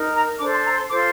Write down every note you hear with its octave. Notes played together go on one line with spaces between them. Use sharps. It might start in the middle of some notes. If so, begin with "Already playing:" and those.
Already playing: D#4 A#4
A#5
D4 A4 C5 D6
C6
A#5
C6
F4 A4 C5 D6